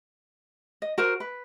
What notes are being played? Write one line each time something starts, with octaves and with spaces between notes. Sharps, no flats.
D#5
F#4 A#4 C5
B4